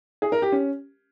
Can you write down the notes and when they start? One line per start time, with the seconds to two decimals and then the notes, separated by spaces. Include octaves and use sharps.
0.22 G#4
0.32 A#4
0.42 G4
0.52 C#4